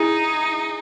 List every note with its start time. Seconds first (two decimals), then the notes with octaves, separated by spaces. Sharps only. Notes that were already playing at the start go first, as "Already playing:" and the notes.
Already playing: D#4 E4 G#4